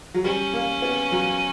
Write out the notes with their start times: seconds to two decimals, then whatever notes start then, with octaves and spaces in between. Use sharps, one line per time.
0.14 F#3
0.24 G3 C#4
0.53 A#3
0.82 B3
1.12 F#3